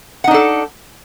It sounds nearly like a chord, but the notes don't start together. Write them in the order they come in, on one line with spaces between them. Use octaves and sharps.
F#5 D#4 D4 A4